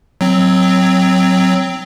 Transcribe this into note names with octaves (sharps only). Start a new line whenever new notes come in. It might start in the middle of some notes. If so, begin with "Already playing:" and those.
F#3 C4